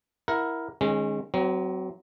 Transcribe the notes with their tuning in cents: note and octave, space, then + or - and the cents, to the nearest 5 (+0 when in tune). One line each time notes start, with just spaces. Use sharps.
E4 +0 A#4 +10 F#5 -15
D#3 -30 G#3 +0 C#4 -30
F#3 +20 C4 -25